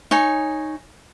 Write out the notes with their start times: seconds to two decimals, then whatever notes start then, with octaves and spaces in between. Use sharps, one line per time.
0.11 D#4 C#5 G#5